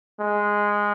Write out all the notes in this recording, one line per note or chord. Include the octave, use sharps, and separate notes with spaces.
G#3